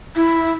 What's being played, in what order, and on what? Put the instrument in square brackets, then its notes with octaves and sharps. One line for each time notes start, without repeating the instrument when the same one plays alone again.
[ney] E4